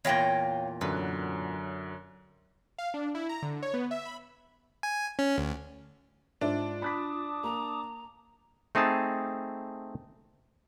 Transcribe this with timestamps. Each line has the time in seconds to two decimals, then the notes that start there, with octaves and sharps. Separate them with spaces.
0.05 E2 A#2 C#5 F5 G5
0.81 F#2 D3 F#3 B4
2.78 F5
2.94 D4
3.15 E4
3.29 A#5
3.42 D3
3.63 C#5
3.74 B3
3.91 E5
4.05 B5
4.83 G#5
5.19 C#4
5.38 D2
6.41 G#2 D4 F4 C5 E5
6.82 A5 B5 D6 D#6 F#6 B6
7.44 A#3 A#5
8.75 A3 C4 D#4 G#4 A5